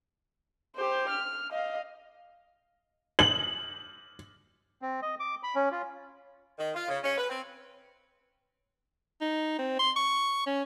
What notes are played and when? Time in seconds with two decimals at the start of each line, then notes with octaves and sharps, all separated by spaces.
0.77 G4 C5
1.10 F6
1.51 D#5 F5
3.19 F#7
4.82 C4
5.02 D#5
5.20 D6
5.43 B5
5.55 C#4
5.72 F4
6.58 D#3
6.75 F4
6.88 C#3
7.03 C#4
7.18 B4
7.30 C4
9.21 D#4
9.59 C4
9.79 C6
9.96 C#6
10.46 C#4